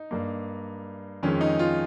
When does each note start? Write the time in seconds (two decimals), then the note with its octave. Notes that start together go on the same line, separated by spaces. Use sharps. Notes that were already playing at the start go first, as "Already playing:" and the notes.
Already playing: D#4
0.11 G2 G3 A#3
1.23 F2 D#3 G#3 C#4
1.41 D#4
1.59 F4